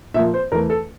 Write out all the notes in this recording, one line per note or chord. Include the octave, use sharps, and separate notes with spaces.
A#2 F3 A#3 E5
C5
E2 E3 A3 A#4
A4